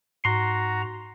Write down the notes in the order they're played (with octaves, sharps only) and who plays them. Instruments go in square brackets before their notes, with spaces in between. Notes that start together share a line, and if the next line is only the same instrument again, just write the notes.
[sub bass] G#2 [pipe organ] F#4 A#5 [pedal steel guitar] C6